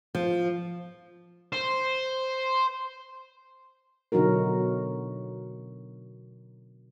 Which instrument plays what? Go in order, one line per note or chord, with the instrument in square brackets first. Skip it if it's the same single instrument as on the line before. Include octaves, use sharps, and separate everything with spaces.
[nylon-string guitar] F3
[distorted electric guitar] C5
[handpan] B2 D3 F#3 D#4 F#4 A#4